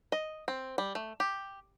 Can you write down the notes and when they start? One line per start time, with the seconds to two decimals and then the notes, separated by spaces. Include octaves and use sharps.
0.12 D#5
0.48 C4
0.78 G3
0.95 A3
1.20 G4